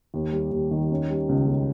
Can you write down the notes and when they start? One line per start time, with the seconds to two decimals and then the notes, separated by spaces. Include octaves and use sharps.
0.14 D#2
0.33 G3
0.52 D#2
0.71 D#3
0.91 C#4
1.10 G3
1.29 C#2
1.48 C#3